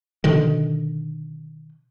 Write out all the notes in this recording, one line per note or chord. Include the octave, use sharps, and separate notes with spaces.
B2 D3 D#3